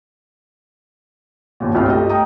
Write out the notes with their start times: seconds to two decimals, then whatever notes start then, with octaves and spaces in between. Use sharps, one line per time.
1.60 G1 D#2 A#2
1.74 G1 C2 F4 E5 F6
1.87 A3 G4 D#5
2.09 G5 A#5 D#6